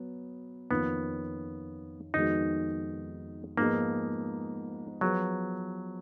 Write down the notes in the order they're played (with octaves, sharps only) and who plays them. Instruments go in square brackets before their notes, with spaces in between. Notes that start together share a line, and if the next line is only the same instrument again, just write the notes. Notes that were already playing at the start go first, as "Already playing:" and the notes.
Already playing: [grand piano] F#3 B3
[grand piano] F2 D#3 A#3 C#4 F4 [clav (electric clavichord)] B3
[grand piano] F2 D#3 G#3 B3 F#4 [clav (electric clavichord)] D#4
[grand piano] G#2 F3 G#3 B3 D#4 [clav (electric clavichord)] A#3
[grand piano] F3 B3 F4 G#4 B4 [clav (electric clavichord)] F#3